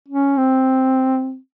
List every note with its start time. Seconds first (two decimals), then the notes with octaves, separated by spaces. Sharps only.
0.09 C#4
0.37 C4